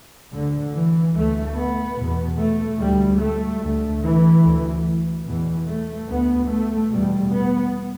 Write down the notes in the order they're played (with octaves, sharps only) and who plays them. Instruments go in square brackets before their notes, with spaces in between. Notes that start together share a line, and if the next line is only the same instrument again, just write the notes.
[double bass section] D2 D3
E3
D2 A3
B3
E2 B2
A3
D2 G3
A3
D2 A3
E3
D2
E2 B2 E3
A3
D2 B3
A3
E2 B2 G3
B3